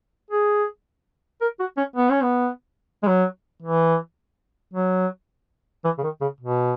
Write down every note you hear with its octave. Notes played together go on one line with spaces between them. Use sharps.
G#4
A#4
F#4
C#4
B3
C#4
B3
G#3
F#3
E3
F#3
E3
C#3
D#3
C#3
B2